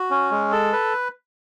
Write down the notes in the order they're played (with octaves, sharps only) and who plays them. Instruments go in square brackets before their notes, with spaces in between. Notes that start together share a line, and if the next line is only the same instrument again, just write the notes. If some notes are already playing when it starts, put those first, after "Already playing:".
Already playing: [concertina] F#4
C#4
G#3
A4
B4